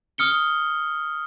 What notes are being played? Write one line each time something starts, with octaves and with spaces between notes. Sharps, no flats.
D#6 F6 C#7 G7